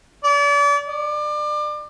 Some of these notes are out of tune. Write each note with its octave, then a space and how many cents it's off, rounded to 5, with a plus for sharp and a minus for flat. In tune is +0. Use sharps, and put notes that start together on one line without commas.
D5 -35
D5 +30